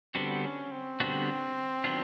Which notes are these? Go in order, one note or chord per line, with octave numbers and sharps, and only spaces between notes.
D3 G3 B3 C4 D4 F#4
C#4
C4
D3 G3 B3 D4 F#4
D#3 F#3 B3 D4 F4